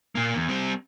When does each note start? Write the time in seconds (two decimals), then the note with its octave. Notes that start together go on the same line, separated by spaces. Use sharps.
0.15 A#2 A#3
0.35 E2
0.49 G3 C4